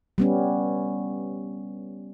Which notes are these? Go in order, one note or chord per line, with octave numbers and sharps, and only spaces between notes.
G3 B3 C#4